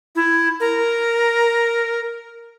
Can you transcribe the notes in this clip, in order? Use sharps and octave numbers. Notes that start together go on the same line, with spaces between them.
E4
A#4